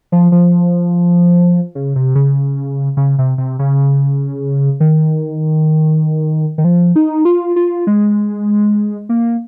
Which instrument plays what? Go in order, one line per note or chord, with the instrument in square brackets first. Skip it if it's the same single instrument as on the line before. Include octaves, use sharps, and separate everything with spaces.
[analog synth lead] F3
F3
C#3
C3
C#3
C#3
C3
C3
C#3
D#3
D#3
F3
D#4
F4
F4
G#3
A#3